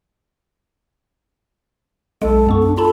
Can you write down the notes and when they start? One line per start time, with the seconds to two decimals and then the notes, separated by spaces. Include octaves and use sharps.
2.22 B1 G#3 A4
2.47 F#2 B3 C#6
2.62 D4
2.77 F4 A4 A5 B5